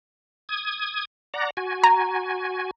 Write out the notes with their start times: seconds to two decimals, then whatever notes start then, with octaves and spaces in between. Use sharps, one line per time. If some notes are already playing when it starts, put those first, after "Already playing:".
0.49 D#6 G#6
1.34 D5 F#5 A#5
1.57 F#4 G#5
1.84 A#5